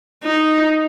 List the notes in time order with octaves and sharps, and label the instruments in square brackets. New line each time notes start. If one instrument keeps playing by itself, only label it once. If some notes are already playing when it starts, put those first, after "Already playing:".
[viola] D#4